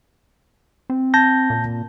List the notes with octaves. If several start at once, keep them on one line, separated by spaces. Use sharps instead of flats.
C4
A5 G6 A#6
A#2